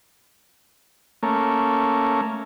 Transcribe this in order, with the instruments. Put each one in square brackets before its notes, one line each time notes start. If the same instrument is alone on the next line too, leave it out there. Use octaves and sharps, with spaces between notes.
[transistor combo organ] A3 A#3 C#4